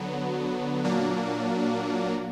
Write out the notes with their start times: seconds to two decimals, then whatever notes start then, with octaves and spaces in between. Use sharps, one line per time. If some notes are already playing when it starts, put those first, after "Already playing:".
Already playing: D3 F#3 B3
0.84 A#2 F#3 A#3 D4